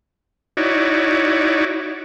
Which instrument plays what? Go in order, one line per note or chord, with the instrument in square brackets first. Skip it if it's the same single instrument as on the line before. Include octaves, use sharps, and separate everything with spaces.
[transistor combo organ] D#4 E4 F#4 C#5 D5